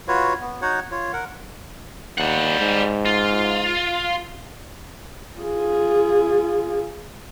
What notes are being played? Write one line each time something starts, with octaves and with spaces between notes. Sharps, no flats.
F4 F#4 B4 C#5
B3
D#4 F#4 C#5 F#5
F4 C#5
A#4 F#5
D#2 G3 F#5
G#2
F4
F4 G#4